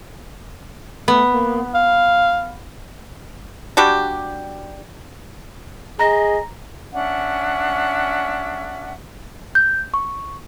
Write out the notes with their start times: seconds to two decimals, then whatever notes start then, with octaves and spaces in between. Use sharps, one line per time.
1.08 A3 B3
1.31 A#3
1.75 F5
3.77 G3 D4 F#4 G4
5.99 G#4 D#5 A#5 A#6
6.92 C#4 D4 E5 F#5
9.55 G6
9.94 C#6